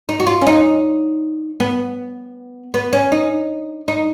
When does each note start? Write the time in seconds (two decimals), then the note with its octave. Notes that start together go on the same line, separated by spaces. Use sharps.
0.09 D#4
0.20 F#4
0.27 F4
0.41 C#4
0.47 D#4
1.60 B3
2.74 B3
2.93 C#4
3.12 D#4
3.88 D#4